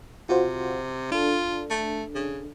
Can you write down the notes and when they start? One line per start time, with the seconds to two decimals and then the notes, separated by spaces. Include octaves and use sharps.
0.29 C3 F4 F#4 C5
1.12 D4 F4 A4
1.70 A3
2.15 C#3